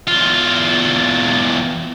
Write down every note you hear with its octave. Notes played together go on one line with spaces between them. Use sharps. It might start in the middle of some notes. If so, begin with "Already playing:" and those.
E2 F4